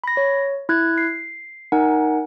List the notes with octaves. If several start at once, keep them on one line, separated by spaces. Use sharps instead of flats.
B5 A#6
C#5
E4 F#6 G#6
C7
D#4 A#4 F#5 G#5